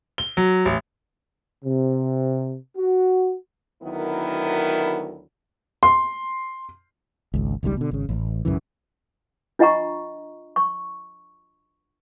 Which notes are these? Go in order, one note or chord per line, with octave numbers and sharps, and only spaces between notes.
G7
F#3
A1
C3
F#4
D2 D#3 F#3 B3 E4 A#4
C6
G#1 C#2
G#1 C#2 G#2 G3
B2 D3
G#1 C#3
A1
B1 F#2 C#3 E3
D4 F4 D#5 F#5 A#5 C#6
C#6